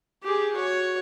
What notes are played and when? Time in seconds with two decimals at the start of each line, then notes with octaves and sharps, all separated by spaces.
0.24 G4 G#4
0.54 F#4 C#5